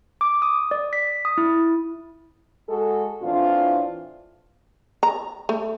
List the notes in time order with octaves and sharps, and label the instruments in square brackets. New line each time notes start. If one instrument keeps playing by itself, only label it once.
[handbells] D6
D#6
D5
B6
D#6
E4
[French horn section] G#3 F#4 G#4 A4
A2 E3 C4 D4 F4
[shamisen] A#5
A3